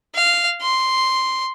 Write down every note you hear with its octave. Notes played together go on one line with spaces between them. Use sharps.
F5
C6